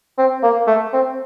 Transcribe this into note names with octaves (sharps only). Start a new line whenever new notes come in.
C4
A#3
A3
C4